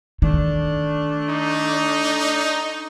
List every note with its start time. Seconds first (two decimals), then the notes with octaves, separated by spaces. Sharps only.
0.22 D#3 A3 D4
1.29 D#4